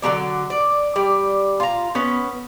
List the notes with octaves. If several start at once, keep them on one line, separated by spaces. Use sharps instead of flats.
D3 F#3 B3 D5
D5
G3 D5
F4 A#5
B3 C#4 B4